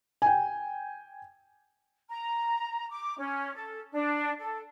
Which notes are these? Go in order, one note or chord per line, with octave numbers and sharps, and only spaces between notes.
G5 G#5
A#5
D6
C#4
A4
D4
A4